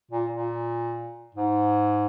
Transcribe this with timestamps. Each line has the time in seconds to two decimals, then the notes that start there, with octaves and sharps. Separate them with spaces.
0.11 A#2
0.32 A#2
1.35 G#2